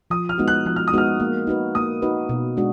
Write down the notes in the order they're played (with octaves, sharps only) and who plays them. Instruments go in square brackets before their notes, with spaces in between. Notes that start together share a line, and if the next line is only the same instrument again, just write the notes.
[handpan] F3 [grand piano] D#6
[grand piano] F6
[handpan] G#3 B3 D#4 F#4
[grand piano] F#6
[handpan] F3 [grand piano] F#6
[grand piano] F6
D#6
[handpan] G#3 B3 D#4 F#4 [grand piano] F6
[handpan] A#3
D#4 F#4 B4
[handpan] A#3 [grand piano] D#6
[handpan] D#4 F#4 B4
B2
G#3 D4 F#4